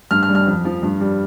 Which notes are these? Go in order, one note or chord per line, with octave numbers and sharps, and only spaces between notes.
G2 F6
F6
G3
F6
F2
F3
G2
G3